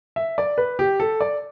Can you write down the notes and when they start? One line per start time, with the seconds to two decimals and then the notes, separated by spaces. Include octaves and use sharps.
0.16 E5
0.38 D5
0.58 B4
0.79 G4
1.00 A4
1.21 D5